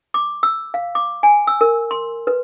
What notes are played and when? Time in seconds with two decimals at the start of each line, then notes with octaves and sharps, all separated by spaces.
0.14 D6
0.43 E6
0.74 F5
0.95 D6
1.23 G#5
1.47 E6
1.61 A#4
1.91 C6
2.27 B4